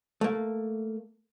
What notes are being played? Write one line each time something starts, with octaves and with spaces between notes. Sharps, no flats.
A3 A#3